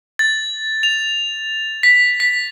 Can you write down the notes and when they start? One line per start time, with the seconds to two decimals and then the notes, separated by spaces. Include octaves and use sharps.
0.19 A6
0.83 F7
1.83 B6
2.20 B6